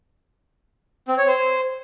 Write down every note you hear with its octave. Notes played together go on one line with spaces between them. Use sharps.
C4
C#5
C5